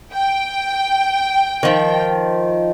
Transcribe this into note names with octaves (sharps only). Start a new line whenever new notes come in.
G5
D#3 F3